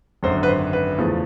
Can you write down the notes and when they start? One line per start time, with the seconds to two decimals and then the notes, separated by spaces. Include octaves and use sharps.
0.23 G#1 F#2 D3 C5
0.43 B4
0.48 C5
0.73 B4
0.98 E2 C#3 F3 A3